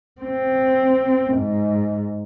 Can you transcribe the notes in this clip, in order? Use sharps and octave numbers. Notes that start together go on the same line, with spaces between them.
C4
G#2